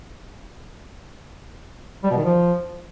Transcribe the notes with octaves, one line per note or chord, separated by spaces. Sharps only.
G3
B2
D#3
F3